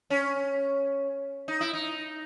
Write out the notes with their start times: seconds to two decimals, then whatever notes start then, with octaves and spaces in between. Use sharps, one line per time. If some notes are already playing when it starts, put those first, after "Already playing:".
0.10 C#4
1.48 D#4
1.61 E4
1.73 D#4